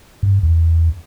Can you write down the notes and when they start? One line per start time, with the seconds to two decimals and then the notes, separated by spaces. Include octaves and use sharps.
0.23 G2
0.43 E2